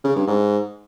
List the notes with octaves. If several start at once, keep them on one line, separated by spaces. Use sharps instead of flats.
C#3
G2
G#2